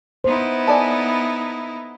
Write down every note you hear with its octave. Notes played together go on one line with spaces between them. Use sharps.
B3 D#4 E4 C5
A4 D5 G#5